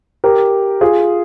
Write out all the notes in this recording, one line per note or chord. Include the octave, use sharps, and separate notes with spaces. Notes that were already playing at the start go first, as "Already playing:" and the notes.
G4 A#4
F4 G#4